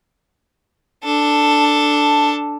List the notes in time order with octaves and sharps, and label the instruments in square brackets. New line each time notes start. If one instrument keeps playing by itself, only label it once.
[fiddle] D4 A4